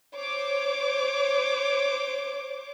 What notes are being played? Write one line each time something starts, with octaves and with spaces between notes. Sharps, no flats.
C5 C#5 D6